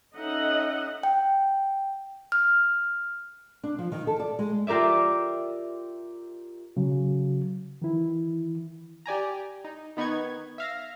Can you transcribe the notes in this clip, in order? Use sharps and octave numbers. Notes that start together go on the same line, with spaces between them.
C#4 D#4 A4 D#5 E5 F#5
G5
F6
D4
F3
D#3
A4
D5
G#3
F4 G4 A#4 D5 E5
C#3 F#3 F#4
D#3 E3 E4
G4 D5 G#5 A#5
D#4
D#3 B3 D#4 C#6 G#6
E5 F5 A#6